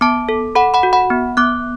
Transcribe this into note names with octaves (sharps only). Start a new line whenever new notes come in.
B3 A5 D6
A4
A4 F#5 B5
F#5 B5
F#4
F#5 B5
B3
B3 D6 F#6